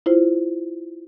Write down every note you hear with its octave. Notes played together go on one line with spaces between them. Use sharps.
E4 F4 C5